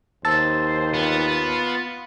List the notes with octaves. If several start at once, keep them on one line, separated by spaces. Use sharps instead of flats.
D#2 C5 A5 E6 A6
B3 F4